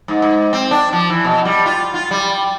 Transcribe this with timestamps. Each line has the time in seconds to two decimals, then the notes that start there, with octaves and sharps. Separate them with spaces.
0.08 G#2
0.22 G#2
0.53 C4
0.71 D4
0.93 F3
1.10 E3
1.24 B2
1.45 G3
1.66 F4
1.94 F4
2.11 G3